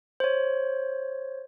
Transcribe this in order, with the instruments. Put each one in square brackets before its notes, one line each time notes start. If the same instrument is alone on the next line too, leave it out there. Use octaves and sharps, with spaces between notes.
[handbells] C5 C#5